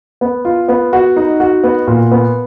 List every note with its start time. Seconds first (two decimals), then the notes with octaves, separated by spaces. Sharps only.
0.21 B3
0.45 F4
0.68 B3
0.93 F#4
1.16 D#4
1.40 F#4
1.64 B3
1.87 A#2
2.11 B3